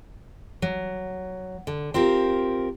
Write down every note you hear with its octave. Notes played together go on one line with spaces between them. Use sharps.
F#3
D3
C4 F4 G4 A#4